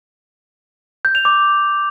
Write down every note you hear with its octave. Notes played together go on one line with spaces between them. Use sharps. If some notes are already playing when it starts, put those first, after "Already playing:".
G6
F7
D6